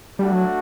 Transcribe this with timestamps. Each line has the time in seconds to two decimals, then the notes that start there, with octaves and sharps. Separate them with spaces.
0.19 G3 A3 D4 F#4
0.32 F#3